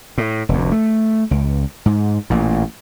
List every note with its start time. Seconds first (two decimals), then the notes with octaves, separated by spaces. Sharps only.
0.18 A2
0.49 F1 D2
0.72 A3
1.31 C#2
1.86 G#2
2.30 A1 A#2